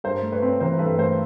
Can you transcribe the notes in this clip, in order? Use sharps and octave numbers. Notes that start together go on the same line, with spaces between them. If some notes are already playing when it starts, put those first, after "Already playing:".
G2 A#4 C5
A3
B4 C#5
C4
E3 A#4 C5
G2 A4 B4
A3 A#4 C5